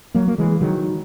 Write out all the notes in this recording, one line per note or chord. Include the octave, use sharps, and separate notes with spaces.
F#3 A#3
A#3
E3 G#3
D#3 F#3